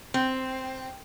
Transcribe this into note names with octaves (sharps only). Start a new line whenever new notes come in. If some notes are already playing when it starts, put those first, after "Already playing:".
C4